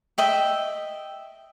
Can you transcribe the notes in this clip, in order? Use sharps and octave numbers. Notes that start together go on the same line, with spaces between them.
D#5 E5 G5